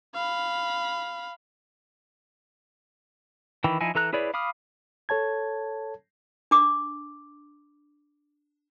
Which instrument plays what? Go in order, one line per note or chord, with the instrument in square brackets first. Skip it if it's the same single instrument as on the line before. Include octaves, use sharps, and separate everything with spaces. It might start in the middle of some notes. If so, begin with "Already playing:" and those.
[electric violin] F5 B5
[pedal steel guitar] D#3 E3 G5 B5
F3 D#4 E4 G#5
E3 A4 A#5 F#6
E4 G#4 B4 C#5 D5
F5 B5 D6 D#6 F6
[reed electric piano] A4 C#5 A5 G#6
[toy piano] D4 D6